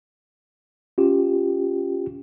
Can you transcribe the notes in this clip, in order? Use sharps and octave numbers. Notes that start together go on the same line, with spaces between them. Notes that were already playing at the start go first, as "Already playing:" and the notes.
C#4 F4 G4